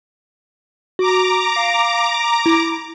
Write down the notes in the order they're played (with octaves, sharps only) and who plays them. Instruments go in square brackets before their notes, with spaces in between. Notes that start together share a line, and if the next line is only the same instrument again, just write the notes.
[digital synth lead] F#4 [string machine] A#5 D6
[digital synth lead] F5
E4